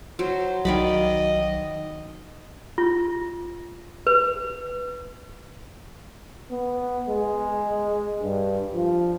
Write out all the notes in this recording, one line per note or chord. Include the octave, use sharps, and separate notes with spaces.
F#3 C5
B1 D#3 F#3 D5 D#5 B5
F4
B4
B3
G#3
G2
F3